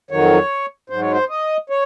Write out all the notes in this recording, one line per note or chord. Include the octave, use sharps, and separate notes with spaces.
F2 D#3 F#3 C#5
G#2 F#3 C5
C#5
C5
D#5
C#5